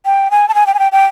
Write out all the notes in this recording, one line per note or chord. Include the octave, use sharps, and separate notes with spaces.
G5
G#5
A5
G#5
G5
G#5
G5
G5